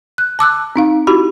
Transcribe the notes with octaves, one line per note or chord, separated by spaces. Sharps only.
F#6
A5 D6 E6 F#6
C4 D#4 F5
E4 F#4 G4 B5